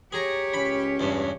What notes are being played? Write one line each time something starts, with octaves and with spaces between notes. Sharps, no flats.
G4 G#4 C#5 A#5
C#2 C#4 B5
E2 G2